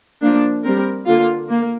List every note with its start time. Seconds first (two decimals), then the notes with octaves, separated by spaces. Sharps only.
0.22 F3 A#3 D4
0.64 G3 C4 A#4
1.06 D3 A#3 F4
1.49 A#3